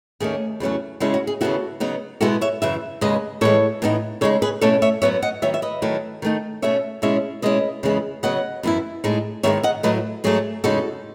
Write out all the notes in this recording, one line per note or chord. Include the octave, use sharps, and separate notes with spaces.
D#2 D#3 A3 C#4 G#4
E2 C#3 F#3 A3 C#4
C#3 G#3 C#4 E4 F#4 A4
F#4
G#4
D#2 C#3 F#3 B3 E4 F#4 A4
C#3 F#3 B3 D#4
B2 G#3 B3 E4 F#4 A4
C#5 E5
F#2 C#3 E3 E5
D#2 C#3 G#3 B4 D#5
A2 E3 G#3 A4 C#5
A2 E3 B3 D#4
C#3 G#3 D#4 A4 C#5
G#4 B4
B2 A3 C#4 E4 A4 C#5
C#5 E5
F#2 C#3 F#3 B3 C#5 E5
D#5 F#5
D#3 F#3 B3 C#5 E5
E5
B4 D#5
D#3 F#3 A3 E4
D#3 A3 D#4
B2 A3 C#4 C#5 E5
B2 G#3 C#4 E4 C#5 E5
B2 G#3 C#4 E4 B4 D#5
E2 C#3 E3 G#3 B3
C#3 F#3 B3 D#5 F#5
F#2 E3 B3 E4
A2 G#3 D#4
G#2 D#3 G#3 B3 D#4 C#5 E5
D#5 F#5
A2 F#3 A3 B4 D#5
G#2 F#3 A3 G#4
E2 C#3 G#3 D#4 F#4 A4